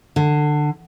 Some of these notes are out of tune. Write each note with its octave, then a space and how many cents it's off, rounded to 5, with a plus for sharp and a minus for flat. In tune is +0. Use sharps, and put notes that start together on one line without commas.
D3 +20